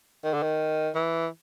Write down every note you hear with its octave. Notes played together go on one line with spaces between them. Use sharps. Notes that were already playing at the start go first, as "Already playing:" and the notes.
D#3
D3
D#3
E3